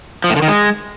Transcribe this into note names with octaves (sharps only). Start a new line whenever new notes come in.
F3
A2
D3
D#3
G#3